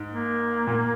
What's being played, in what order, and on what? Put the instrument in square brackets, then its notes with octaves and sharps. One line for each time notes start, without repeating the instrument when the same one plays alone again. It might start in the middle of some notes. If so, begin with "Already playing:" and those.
Already playing: [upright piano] G#2
[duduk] A#3
[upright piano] A#2